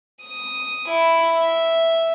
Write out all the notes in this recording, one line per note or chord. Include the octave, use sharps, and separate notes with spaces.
D#6
E4
E5